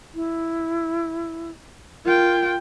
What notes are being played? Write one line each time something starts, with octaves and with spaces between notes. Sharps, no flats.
E4
F4 A#4 G5